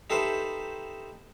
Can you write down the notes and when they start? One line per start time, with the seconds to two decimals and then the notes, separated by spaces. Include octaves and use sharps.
0.10 D#4 G4 A4 B4 C5 E5